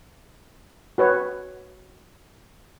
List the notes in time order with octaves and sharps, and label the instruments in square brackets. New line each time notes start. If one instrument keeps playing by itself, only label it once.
[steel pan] F#4 B4 C#5